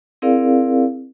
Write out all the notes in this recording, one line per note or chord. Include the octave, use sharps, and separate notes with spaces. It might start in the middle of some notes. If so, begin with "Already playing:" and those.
C4 E4 G#4 A#4 D5 F5